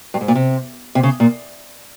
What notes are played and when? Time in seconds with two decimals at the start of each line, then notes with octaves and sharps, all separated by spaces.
0.14 G2
0.21 G#2
0.28 A#2
0.35 C3
0.95 C3
1.03 C#3
1.20 A#2